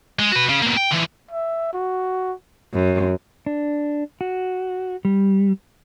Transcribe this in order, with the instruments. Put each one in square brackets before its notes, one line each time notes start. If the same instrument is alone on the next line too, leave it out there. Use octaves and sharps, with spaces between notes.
[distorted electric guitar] G#3
F#4 B4
C#3
B2 A#3
G5
D3 E3
[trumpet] E5
F#4
[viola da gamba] F#2
[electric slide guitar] D4
F#4
G3